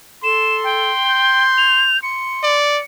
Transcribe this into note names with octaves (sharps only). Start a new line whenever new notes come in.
A4 C6 E7
G5
G6
F7
C6 C#7
D5